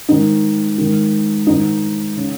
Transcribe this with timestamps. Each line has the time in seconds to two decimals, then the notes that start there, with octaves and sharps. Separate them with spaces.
0.09 G#2 D#3 D#4
0.78 G#2 D#3
1.47 G#2 D#3 D#4
2.17 C#3